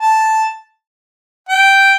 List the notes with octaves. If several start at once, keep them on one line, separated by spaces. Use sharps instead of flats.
A5
G5